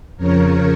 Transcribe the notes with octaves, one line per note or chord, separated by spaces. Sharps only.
F2 C#3 F3 A#4 C#5